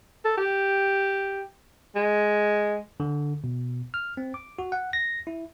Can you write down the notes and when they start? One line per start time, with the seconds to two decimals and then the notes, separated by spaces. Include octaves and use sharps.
0.25 A4
0.37 G4
1.95 G#3
3.00 D3
3.44 B2
3.94 F6
4.17 C4
4.34 D6
4.59 F#4
4.72 F#5
4.93 A#6
5.27 E4